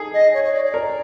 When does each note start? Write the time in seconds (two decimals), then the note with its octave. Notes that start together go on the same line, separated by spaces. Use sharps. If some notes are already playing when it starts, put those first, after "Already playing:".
Already playing: D#4 G#4 A4
0.13 D#5
0.33 C#5
0.44 C#5
0.54 D5
0.64 D5
0.74 A#4